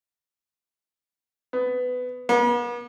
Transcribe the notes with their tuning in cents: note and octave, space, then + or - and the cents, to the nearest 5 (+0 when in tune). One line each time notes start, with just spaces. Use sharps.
B3 +20
B3 -40